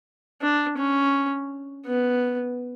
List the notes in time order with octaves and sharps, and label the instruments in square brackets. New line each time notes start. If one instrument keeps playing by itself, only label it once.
[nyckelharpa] D4
C#4
B3